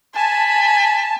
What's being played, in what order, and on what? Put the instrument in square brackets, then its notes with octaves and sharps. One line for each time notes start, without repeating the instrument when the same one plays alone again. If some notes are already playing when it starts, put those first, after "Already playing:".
[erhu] G#5 [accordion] A5 [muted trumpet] B5